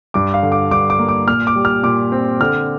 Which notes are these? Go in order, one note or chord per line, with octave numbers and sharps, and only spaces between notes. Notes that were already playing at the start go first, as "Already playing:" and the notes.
G2 D6
F5
D3
D6
G2 D6
D6
A#3
D6
A#2 F6
D6
G3
F6
A#2 D6
C4
D3 F6